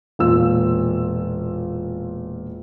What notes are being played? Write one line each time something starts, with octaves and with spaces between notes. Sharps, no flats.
E1 A#2 F4 E6